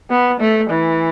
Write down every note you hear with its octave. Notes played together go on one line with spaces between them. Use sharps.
B3
A3
E3